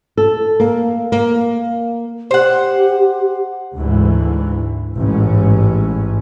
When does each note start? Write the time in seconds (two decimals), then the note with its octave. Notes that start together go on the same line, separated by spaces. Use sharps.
0.17 A4
0.60 A#3
1.12 A#3
2.31 G4 C5 F#5
3.76 D2 G#2 E3
4.96 A1 G#2 C#4